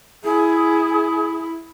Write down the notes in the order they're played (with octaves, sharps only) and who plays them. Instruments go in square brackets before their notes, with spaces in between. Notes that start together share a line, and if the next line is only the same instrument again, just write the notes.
[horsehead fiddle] E4 [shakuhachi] G#4